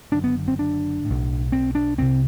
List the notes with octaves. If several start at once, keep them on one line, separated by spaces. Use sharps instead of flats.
F#1 F#2 D3 D4
B3
C4
D4
B1 A2
C4
D4
C2 C3 C4